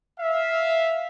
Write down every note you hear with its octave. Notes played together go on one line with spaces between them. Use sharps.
E5 F5